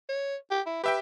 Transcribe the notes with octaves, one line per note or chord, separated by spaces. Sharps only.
C#5
G4
E4
G4 B4 E5 G5